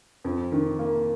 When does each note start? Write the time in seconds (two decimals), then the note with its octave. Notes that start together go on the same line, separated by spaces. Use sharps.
0.25 F2
0.52 D#3
0.79 A#3